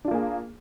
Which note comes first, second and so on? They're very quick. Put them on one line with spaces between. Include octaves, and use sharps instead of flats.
D4 F4 A#3 G#4